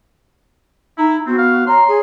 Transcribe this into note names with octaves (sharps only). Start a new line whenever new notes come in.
D#4 E4 A#5
B3 C4 F#4
F5
C#5 A#5 C6
G#4